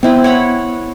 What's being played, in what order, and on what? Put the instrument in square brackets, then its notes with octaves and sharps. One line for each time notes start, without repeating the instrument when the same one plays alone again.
[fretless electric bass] B3 [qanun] C4 E4 B4
[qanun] C#5 F#5 B5